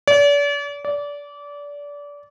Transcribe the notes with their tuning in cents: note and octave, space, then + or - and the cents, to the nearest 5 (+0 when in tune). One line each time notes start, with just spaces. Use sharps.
D5 -40
D5 -25